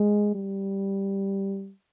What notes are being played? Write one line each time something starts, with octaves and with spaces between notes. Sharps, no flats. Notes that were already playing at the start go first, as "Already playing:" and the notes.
Already playing: G#3
G3